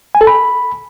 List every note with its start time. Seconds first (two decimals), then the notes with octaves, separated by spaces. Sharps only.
0.15 G#5
0.21 A4
0.27 B5